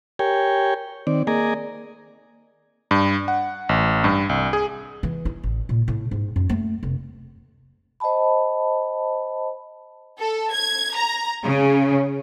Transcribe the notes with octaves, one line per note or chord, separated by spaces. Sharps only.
G4 A#4 C#5 G5 G#5
D#3 C4 D5
A#3 G#4 D5 D#5 G#5 A#5
G2
F#5
A1
G2
C2
G#4
E3
E4
A1
A#2
A2
G#2
F#2
A3
F1
C5 D#5 G5 A5 B5
A4
G#6
A#5
C#3